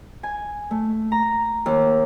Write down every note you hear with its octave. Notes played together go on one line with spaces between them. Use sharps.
G#5
A3
A#5
D#2